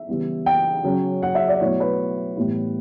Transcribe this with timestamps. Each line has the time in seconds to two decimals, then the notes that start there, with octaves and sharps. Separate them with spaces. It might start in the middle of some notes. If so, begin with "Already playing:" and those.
Already playing: E5
0.09 C#3 E3 G3 B3
0.46 G5
0.84 C#3 F#3 C#4
1.23 F#5
1.35 E5
1.48 D5
1.61 B2 F#3 A3 E4 C#5
1.80 B4
2.37 A2 E3 G3 B3 E4